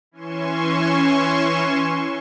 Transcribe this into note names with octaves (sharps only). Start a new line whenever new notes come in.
E3 C#4 G#5 C6 C#6 E7